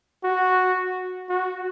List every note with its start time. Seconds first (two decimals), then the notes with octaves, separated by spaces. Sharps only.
0.24 F#4
1.29 F#4